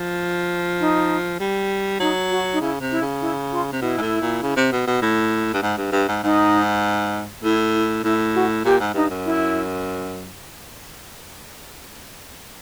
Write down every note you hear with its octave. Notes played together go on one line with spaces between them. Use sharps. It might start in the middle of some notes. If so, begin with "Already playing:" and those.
Already playing: F3
D#4
G3
F#3 D#4
F#4
D#4
C#3 E4
C3
E4
C#3
E4
F4
C3
B2 E4
G#2
A2
A#2
C#3
C3
B2
B2
A2
G2
G#2
G2
G2
G#2
G#2 D#4
A2 E4
E4
A2 E4
F#4
A#2 G4
G#2
G2 D#4
F#2
E4